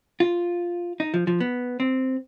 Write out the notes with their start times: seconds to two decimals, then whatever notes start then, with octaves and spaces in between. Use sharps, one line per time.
0.20 F4
1.00 D#4
1.14 F3
1.27 F3
1.40 B3
1.80 C4